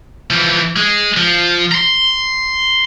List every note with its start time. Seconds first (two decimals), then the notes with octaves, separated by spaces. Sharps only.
0.30 E3 F3
0.76 G#3
1.17 F3
1.72 A#5 C6